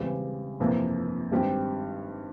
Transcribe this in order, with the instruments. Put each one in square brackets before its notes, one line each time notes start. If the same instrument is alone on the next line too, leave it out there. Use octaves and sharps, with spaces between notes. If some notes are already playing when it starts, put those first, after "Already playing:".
Already playing: [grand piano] E1 E2 C#3 G3 C4
G1 F2 C3 E3 A#3
G#1 G2 G3 C4 G4